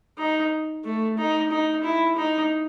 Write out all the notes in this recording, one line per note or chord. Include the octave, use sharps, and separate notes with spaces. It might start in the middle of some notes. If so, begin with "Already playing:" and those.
D#4
A3
D#4
D#4
E4
D#4